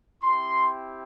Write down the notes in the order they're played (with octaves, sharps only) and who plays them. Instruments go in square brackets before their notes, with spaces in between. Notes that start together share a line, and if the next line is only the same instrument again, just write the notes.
[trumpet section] C4 E4 G4 C6